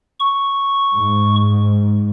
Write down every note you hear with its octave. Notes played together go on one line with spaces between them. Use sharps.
C#6
G#2